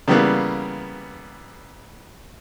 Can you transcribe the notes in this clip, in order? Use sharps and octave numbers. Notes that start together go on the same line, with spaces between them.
C#3 E3 G3 A#3 B3